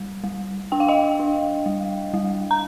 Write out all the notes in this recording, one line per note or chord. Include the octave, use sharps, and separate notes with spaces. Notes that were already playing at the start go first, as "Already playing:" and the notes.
Already playing: G3
G3
D4 G5
F5
D#5 G5
D4
G3
G3
A#5